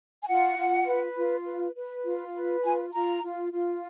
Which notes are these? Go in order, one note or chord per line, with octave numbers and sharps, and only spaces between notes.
G#5
F4 F#5
F4
B4
F4
B4
B4
F4
B4
F4 G#5
F4 A#5
F4
F4